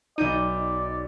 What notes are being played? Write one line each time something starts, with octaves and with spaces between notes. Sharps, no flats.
B1 D#4 D5 G6 D#7